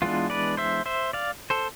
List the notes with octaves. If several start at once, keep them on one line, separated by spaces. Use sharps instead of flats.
E3 G#3 B3 D4 F4
B4 D5
C5 E5
C5 E5
D5 F5
A4 C5